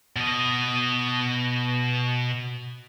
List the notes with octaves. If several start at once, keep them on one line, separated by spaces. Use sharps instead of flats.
B2 D#5